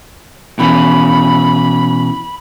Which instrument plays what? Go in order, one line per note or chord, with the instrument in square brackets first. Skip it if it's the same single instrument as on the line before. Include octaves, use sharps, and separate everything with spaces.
[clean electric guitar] B2 E3 C#4 [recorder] B5